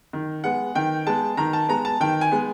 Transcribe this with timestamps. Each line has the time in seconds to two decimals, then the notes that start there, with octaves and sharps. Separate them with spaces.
0.13 D#3
0.44 G#3 B3 F#5
0.75 D#3 G5
1.07 G#3 B3 A5
1.37 D#3 A#5
1.53 A5
1.69 G#3 B3 A#5
1.85 A5
2.01 D#3 G5
2.21 G#5
2.32 G#3 B3